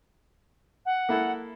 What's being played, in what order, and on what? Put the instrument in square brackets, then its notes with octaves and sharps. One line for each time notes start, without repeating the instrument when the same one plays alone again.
[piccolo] F#5
[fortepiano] A#3 E4 A4